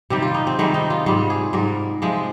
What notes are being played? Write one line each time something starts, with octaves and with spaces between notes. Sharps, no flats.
C3 D#3 G3 G4
F4
D#4
C4
C3 D#3 G3 G#3
D#4
F4
G#2 G3 F4
G#4
G#2 G3 A#4
C3 F3 G#3